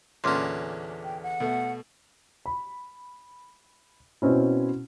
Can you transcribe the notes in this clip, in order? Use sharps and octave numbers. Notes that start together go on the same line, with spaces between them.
E2 A#2 D3 C#4 C6 D6 F6
G5
F#5
B2 A3
B5
B2 C4 C#4 E4